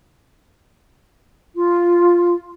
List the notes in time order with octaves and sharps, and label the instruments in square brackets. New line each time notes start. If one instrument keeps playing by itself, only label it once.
[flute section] F4